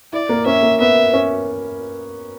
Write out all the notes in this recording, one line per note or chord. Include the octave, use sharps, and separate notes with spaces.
E4 D5
A#3
C#4 E5
A#3
B3 E5
C#4